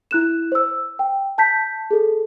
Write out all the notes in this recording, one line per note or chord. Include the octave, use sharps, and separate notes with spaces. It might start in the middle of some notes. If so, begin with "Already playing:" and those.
E4 F#6 E7
C5 E6
G5
A5 G6 B6
G#4 A4